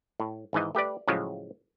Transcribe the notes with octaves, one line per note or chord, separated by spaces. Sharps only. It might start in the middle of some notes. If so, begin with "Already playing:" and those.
A2
G#1 G#2 E3 D#5
A3 G4 B4 D5
A2 C#3 F3 F#3 G#3